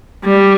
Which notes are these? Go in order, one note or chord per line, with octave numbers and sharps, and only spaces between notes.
G3